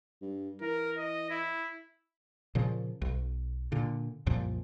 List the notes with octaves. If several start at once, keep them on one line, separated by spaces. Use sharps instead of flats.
G2
E3 A#4
D#5
E4
A#2 C#3 F3
B1
A#2 D3
C2 F#2 A#2 F3